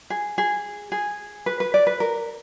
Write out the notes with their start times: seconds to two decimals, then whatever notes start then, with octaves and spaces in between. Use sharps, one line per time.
0.10 G#4
0.38 G#4
0.92 G#4
1.46 B4
1.60 B4
1.74 D5
1.87 B4
2.00 A#4